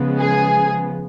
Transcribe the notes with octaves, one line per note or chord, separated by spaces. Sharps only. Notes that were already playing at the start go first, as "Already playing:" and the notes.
Already playing: C#3 F3 G#3 B3
G#4